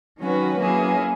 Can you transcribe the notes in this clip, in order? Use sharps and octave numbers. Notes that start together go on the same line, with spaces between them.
D#3 F#3 C#4 F#4 B4
F#3 A#3 C#4 E4 G#4